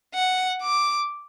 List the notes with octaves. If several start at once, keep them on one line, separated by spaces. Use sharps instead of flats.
F#5
D6